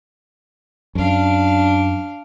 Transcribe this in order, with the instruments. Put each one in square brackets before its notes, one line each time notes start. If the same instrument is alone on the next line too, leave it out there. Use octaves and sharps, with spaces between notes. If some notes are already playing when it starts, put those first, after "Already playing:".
[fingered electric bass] F#2 [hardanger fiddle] D4 F5